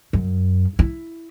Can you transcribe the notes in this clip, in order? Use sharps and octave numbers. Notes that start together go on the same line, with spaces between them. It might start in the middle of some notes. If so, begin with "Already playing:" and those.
F#2
E4